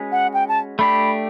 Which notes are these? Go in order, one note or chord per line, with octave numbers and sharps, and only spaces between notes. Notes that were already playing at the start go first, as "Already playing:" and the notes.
Already playing: G#3 C#4 F#4 B4
F#5
G5
A5
A3 D4 G4 B5